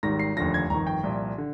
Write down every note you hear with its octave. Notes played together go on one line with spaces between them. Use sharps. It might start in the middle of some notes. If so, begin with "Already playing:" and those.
G#1 G#2 D#3 G3 A#6
C7
F1 D#2 D3 F3 A#6
G#6
G1 F2 D#3 A#5
G5
C2 A#2 F3
D3